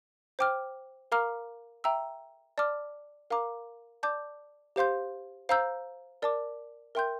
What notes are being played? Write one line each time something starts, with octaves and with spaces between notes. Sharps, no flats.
C5 G5 D6 F6
A#4 F5 A#5 D6 F6
E5 G5 A#5 E6
D5 A5 D6 F6
A#4 F5 A#5 D6
D5 A5 D6 G6
G4 C5 F5 C6 G6
C5 F5 A#5 E6 G6
A#4 D5 A5 D6
A#4 E5 G5 C6 G6